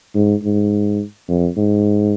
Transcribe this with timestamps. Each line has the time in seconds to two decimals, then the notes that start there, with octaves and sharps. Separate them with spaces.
0.15 G#2
0.43 G#2
1.28 F2
1.57 G#2